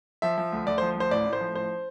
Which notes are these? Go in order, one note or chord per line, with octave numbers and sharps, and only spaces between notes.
F3 E5
F3
D2
D2 D5
F3 C5
D2 C5
A1 D5
A2
C5
F3
A1 C5